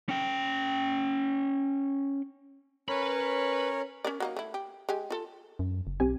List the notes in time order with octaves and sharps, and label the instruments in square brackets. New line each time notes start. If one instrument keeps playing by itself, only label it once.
[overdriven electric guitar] C#4 G5
[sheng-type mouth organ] C#4 A#4 C#5 [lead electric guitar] B4 B5
[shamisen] C#4 A#4 D5
F#3 A#3 D#4
A3 E4
G4
G#3 G4 G#5
F4 A4
[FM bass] F#2
F#1
[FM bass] B1 [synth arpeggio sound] C4 G4 G#5